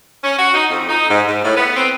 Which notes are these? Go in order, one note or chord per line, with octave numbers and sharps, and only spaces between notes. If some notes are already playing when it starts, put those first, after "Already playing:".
C#4
F#4
D#4
F2
D#4
G#2
G#2
A2
B3
C4